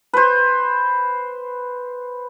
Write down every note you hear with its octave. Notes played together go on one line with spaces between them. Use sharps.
B4 C5